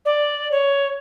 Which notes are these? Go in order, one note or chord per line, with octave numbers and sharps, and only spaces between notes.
D5
C#5